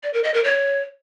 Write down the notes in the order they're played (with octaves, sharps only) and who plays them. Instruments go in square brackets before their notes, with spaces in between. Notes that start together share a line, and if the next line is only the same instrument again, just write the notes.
[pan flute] D5
A#4
D#5
A#4
C#5